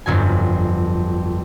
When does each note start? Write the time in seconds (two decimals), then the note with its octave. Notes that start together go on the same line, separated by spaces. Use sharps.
0.06 G1 F2 F#3 G#5